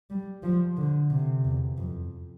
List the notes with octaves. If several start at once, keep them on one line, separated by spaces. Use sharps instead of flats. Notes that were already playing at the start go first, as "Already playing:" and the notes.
G3
F3
D3
C3
E2
F2